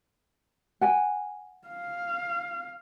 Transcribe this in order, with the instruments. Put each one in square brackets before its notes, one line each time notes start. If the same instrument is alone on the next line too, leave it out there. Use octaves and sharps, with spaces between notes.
[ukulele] F#5 G#5
[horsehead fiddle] F5